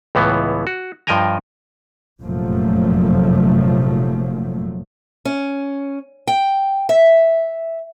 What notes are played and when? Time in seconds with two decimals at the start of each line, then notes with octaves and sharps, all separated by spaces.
0.15 C#2 A2 E3 B3
0.67 F#4
1.07 G2 F3 D#5 G5 G#5 A#5
2.23 F1 F#2 A#2 F3 F#3 A3
5.25 C#4
6.27 G5
6.89 E5